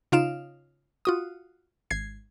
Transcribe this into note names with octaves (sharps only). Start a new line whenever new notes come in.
C#3 D#4 F4 F5 D7 E7
F4 F#4 D#6
G#1 G#6 C7